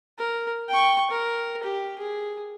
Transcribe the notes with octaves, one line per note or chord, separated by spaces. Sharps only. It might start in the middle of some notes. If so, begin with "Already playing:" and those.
A#4
G5 C#6
A#4
G4
G#4